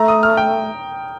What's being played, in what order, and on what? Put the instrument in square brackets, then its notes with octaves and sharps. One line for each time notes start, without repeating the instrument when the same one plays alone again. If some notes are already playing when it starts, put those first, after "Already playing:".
Already playing: [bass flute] A3 [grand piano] A#5
[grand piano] D#6
F6
G5